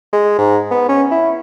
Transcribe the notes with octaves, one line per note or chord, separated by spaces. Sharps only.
G#3
G#2
B3
C#4
E4